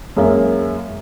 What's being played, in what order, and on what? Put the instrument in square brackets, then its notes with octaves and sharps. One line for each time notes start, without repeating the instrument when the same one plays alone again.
[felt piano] F#2 G#3 A#3 E5